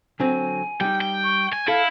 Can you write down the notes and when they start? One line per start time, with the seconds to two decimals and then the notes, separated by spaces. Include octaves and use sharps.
0.20 D3 F#3 C4 G#5
0.81 G3 D#4 G5
1.01 G5
1.24 C#6
1.53 G#5
1.68 E4 A4 F5